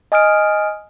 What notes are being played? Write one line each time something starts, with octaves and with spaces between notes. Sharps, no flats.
D#5 G#5 D#6 F6 D7